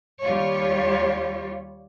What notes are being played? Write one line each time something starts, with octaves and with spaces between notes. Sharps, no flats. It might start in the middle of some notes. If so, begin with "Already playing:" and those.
D#2 G3 F4 G4 C#5